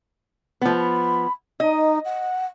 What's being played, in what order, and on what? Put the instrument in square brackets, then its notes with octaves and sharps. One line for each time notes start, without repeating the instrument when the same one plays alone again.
[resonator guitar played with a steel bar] F3 B3 [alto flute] A3
[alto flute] B5
[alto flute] D#4 [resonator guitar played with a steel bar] D#5
[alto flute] F#5